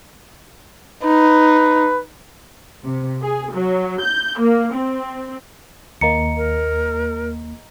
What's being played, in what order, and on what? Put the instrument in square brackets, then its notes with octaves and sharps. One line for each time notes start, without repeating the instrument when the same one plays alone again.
[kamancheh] D#4 [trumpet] B4
[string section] C3
G#4
F#3
G6
A#3
C4
[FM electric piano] D#2 A#3 [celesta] D#5 A#5 C#7
[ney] A#4